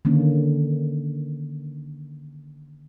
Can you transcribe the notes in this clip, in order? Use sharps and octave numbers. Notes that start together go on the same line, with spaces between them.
D3 D#3 A#3 C#4